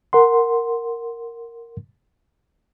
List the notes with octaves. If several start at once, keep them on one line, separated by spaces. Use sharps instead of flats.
A#4 F#5 C6